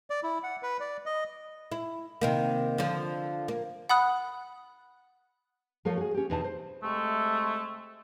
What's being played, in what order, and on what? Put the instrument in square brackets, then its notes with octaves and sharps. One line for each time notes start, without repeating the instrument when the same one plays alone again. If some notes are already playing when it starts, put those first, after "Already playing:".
[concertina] D5
E4
F#5
B4
D5
D#5
[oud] E4
C3 D#3 A#3
D3 F3
A#3
[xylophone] F#5 B5 D#6 F#6
[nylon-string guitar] F3 A3 F4 A4 A#4 C#5
F#4 G#4
C#4 G4
E2 B2 B3 D#4 A5
C5
[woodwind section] C3 G#3 A3